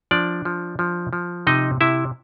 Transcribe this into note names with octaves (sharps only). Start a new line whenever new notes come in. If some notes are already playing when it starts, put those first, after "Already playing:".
F3 D4 D5
F3
F3
F3
C3 D#4 D#5
C3 E4 E5